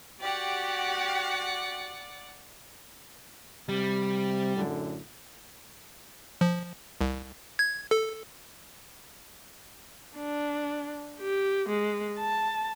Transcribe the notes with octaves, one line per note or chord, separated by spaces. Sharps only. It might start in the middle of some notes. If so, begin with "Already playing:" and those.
F#4 G4 D5 F#5
C3 G3
F#2 A2 D3
F3
C2
G#6
A4
D4
G4
G#3
A5